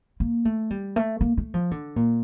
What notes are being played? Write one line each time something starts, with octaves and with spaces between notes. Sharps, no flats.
A#3
A3
G3
A3
A#3
A3
F3
D3
A#2